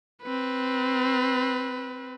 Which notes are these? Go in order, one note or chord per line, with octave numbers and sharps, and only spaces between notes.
C4 B4